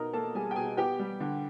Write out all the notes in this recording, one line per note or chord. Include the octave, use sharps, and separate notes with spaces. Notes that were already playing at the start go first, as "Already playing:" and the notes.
Already playing: B2 D#4 A#4 A#5
A#3 A4 A5
G3 G#4 G#5
G5
B2 G#4 G#5
B3 G4 G5
G3
D3